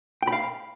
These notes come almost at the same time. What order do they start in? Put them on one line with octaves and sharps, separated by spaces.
G5 B5 F5